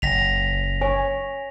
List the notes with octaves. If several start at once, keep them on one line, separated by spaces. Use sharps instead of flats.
F#1 A#6 B6 F7
C#5 G#5